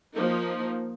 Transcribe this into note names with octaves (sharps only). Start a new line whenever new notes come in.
F3 A#3 D#4